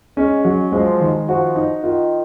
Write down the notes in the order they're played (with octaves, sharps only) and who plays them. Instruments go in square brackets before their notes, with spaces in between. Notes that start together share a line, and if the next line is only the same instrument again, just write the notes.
[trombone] G#3 [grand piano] C#4
[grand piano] F#3
[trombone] F3 [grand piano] G#3
[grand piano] D#3
[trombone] F3 [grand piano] F#4
[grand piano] D#4
[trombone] D#3 [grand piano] F4